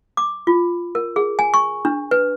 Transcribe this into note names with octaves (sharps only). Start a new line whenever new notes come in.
D6
F4
A#4
G#4
G#5
C#6
D4
B4